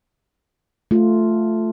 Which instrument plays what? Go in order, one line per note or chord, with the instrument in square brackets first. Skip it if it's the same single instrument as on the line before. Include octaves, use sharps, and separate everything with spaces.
[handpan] A3 F4